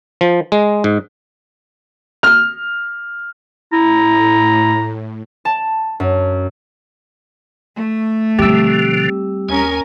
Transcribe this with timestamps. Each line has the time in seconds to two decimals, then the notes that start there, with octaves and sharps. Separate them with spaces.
0.21 F3
0.52 G#3
0.84 G#2
2.23 F6
3.73 A2 E4 A#5
5.45 A5
6.00 F#2
7.75 A3
8.39 B2 D3 F3 G3 C4 G4 E6
9.49 D#2 C#4 A#4 G#5